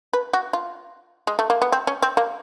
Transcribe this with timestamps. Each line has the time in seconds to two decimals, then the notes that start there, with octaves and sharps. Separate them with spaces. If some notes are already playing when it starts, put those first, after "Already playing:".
0.13 B4
0.33 F#4
0.53 F4
1.27 G#3
1.39 A3
1.50 A#3
1.62 B3
1.72 C4
1.87 C#4
2.02 C4
2.17 A#3